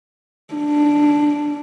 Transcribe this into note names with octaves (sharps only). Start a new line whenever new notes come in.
D4